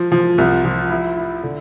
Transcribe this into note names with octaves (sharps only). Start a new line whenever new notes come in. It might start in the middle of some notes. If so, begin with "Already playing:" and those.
Already playing: F3
F3
C2
F3
E4
E4
D3